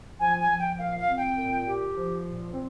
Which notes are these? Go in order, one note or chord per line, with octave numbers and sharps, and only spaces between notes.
F3 G#5
G#5
F3
G5
A#2 F5
F5
C4
G5
A#2
G4
F3
A#2
C4